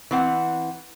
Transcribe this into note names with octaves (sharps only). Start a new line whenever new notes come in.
E3 C4 F#5